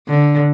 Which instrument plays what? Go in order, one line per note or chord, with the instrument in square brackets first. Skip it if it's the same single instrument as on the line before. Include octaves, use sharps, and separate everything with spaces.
[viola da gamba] D3